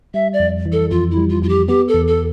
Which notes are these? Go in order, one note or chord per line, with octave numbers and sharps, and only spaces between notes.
G3 E5
D5
F2
E3
A4
F2 F4
E4
G3
F4
F2 F4
G4
B3 G4
A4
E2
A4